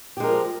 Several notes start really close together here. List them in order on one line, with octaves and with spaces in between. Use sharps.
G4 G#3 A#4 F3